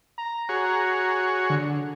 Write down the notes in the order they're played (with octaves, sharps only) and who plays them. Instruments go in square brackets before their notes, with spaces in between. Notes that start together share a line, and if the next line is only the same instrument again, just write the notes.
[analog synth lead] A#5
[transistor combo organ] F#4 G#4 C#5
[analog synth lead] D3